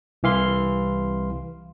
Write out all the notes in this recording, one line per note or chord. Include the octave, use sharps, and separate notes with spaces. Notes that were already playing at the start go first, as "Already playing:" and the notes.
C2 E3 F5 C6